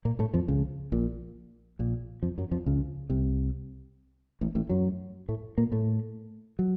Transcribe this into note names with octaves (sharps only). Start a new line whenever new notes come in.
A#2 A#3
A2 A3
F2 F3
C#2 C#3
A#1 A#2
A#1 A#2
F2 F3
F#2 F#3
F2 F3
C#2 C#3
C2 C3
A1 A2
A1 A2
F#2 F#3
A2 A3
A#2 A#3
A2 A3
F#3